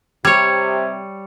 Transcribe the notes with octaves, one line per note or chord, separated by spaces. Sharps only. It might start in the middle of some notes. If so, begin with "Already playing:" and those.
C3 G3 C#5 G#6